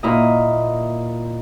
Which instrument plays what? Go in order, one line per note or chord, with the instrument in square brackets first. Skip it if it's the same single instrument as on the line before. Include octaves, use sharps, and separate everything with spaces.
[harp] A#2 E4 A#4 D#5